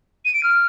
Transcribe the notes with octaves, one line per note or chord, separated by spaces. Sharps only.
D#7
D7
F6